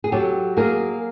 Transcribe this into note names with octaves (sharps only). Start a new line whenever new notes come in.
G#4
F#3 G4 A4
A#3 G#4 A#4